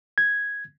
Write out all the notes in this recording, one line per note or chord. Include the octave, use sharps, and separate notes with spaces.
G#6